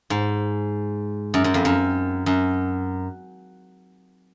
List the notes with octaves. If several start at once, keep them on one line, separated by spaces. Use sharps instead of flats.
G#2
F#2
F#2
F2
F#2
F#2